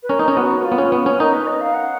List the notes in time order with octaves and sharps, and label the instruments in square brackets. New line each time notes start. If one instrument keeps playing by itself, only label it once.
[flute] B4
[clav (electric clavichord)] C#4 [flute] A#4
[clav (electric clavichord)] D#4
C#4
[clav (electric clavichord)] B3 [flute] F#4
[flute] F#4
F4
[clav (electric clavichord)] B3
C#4
B3
C#4
[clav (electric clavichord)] D#4 [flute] A#4
[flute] B4
D#5
F5
F#5